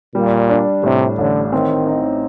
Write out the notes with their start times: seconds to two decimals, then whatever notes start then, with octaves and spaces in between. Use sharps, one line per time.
0.15 A#2 G3
0.50 D4
0.83 A2 C3
1.18 A1 D3
1.52 D#3 C4
1.87 D#4